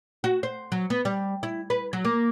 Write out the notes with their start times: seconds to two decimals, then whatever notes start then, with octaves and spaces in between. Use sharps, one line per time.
0.24 F#4
0.43 C5
0.72 F#3
0.90 B3
1.05 G3
1.43 E4
1.70 B4
1.93 F#3
2.05 A#3